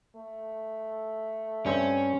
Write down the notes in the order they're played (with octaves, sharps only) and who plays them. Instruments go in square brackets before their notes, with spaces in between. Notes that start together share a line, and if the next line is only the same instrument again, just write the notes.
[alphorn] A3
[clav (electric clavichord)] G2 C4 [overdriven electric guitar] C#4